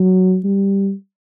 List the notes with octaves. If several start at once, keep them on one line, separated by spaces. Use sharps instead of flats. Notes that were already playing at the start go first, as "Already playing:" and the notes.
Already playing: F#3
G3